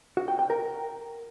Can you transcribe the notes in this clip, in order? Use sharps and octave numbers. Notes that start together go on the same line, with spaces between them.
F#4
G5
G5
A#4